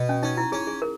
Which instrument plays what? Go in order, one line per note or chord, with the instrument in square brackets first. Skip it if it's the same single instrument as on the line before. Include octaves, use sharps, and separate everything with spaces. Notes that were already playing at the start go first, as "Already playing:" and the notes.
Already playing: [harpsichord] B2
[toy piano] C#4
[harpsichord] C#4 [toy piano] D#4
[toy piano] E4
[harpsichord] C#4 [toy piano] G#4
[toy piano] G#4
A#4